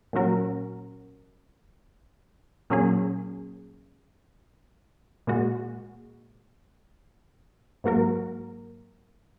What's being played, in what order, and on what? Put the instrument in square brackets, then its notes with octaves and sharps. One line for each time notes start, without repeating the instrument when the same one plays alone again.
[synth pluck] A#2 F#3 C#4 F#4 A#4
A#2 F#3 C#4 G#4
A#2 G#3 F#4
G#2 F#3 A#3 F#4 A#4